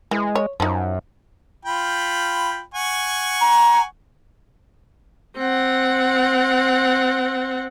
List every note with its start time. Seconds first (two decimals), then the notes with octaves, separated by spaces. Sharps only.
0.11 E3 G#3
0.35 C#5
0.60 F#2 F3 D#4
1.66 F4 G5 B5
2.75 F#5 G#5 C#6
3.41 A#5
5.37 C4 F#5